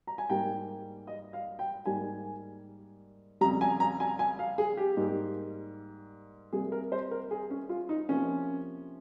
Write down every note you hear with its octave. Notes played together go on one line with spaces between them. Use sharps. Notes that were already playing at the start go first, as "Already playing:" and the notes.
A#5
G#5
G#2 G3 A#3 G5
D#5
F5
G5
G#2 G3 A#3 G#5
F2 C#3 G3 A#5
G#5
A#5
G#5
G#5
F5
G#4
G4
G#2 G3 A#3
C3 G3 A#3 G#4
A#4
C5
A#4
G#4
C#4
F4
D#4
C3 F3 A#3 C#4